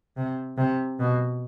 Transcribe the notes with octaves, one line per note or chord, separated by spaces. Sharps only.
C3
C3
B2